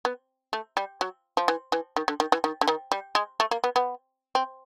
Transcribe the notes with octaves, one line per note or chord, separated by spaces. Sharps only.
B3
A3
G3
F#3
F3
E3
E3
D#3
D3
D#3
E3
D#3
D3
D#3
G3
G#3
A3
A#3
B3
B3
C4